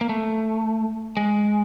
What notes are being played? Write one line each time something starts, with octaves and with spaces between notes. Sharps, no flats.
A#3
A3
G#3